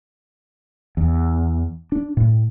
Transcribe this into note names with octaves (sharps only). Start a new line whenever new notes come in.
E2
D4
A2